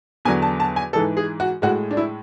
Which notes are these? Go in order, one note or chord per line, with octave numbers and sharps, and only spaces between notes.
E2 D3 F#3 G#5
A5
A5
G#5
G#2 E3 G#3 A4
G#4
F#4
A2 G#3 F#4
D4
E4